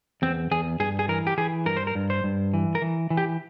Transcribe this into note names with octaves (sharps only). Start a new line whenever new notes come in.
E2 C4
E2 G#4
G2 G#4
G#4
E3 A#4
G4
E3 G#4
G2 A#4
C5
A#4
G2
C5
G2
E3
A#4
E3
E3
G4